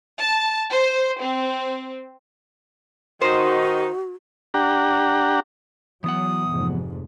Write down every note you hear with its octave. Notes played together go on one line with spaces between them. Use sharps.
A5
C5
C4
D#3 D#4 F#4 C5
D4 G4 F#5 A#5
E3 F#3 B3 F#5 D#6
F1 G#2